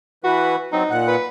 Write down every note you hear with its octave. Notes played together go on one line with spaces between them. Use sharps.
E3 F#4 B4
F#3 C4 D#4
A#2 F#5
B4